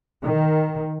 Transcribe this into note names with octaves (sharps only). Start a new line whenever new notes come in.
D#3